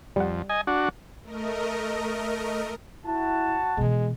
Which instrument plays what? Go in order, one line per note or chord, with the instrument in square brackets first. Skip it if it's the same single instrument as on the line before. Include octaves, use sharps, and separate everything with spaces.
[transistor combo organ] F2 [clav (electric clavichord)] G3 F#5
[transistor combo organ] D#5 G#5
D4 F#4
[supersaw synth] A3 A#4 D#5
[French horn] E4 [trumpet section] F#4 A5
[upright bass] B2 E3 [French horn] G#3